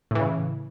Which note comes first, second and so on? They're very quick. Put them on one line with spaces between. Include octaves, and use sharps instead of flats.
A2 E3 C#3